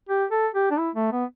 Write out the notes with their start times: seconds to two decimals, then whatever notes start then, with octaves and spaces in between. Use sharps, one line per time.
0.09 G4
0.31 A4
0.55 G4
0.71 D4
0.78 E4
0.95 A3
1.13 B3